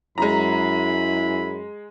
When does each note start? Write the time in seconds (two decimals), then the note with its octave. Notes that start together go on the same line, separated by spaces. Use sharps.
0.18 F#2 G#3 E4 A#5 B5